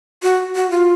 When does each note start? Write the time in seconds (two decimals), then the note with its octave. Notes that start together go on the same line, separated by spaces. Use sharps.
0.23 F#4
0.55 F#4
0.71 F4